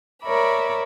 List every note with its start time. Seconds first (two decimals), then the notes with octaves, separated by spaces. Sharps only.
0.23 A#4 C#5 D5 E5 B5